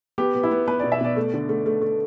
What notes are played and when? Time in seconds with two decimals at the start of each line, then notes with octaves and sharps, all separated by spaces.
0.18 B3 G4
0.35 B3
0.43 E4
0.51 B3
0.68 B3 B4
0.79 D5
0.84 B2
0.92 E5
1.01 B2 D5
1.16 A3
1.34 D3
1.49 A3
1.66 A3
1.82 A3